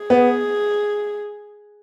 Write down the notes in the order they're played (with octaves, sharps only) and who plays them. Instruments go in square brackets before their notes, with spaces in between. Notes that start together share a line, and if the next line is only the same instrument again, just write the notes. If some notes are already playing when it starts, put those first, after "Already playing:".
Already playing: [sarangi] G#4
[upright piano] B3